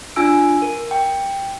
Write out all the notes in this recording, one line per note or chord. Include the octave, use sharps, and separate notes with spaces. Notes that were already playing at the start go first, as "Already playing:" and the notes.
D4 F4 G#5 E6 D7
A#4
G5